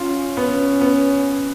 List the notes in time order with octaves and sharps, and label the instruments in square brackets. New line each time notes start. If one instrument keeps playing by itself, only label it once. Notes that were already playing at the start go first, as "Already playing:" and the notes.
Already playing: [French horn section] C#4 [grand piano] F4
[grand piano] B3
B3